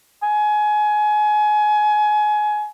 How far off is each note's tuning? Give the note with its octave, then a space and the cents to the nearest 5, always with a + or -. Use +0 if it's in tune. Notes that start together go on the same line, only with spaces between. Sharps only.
G#5 +25